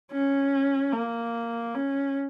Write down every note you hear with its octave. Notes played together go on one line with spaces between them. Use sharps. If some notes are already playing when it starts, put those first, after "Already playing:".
C#4
A#3
C#4